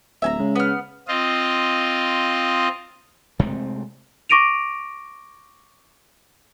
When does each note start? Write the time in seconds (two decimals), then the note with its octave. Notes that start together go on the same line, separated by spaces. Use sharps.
0.22 D1 E5 G#5 A#5
0.39 C#3 G#3
0.56 B3 F6
1.08 C4 F4 D#5
3.39 C3 G#3 A3 C4
4.29 C#6 D6 A#6 D7 D#7 F7